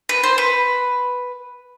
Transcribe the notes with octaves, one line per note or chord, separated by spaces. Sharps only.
B4
C5
B4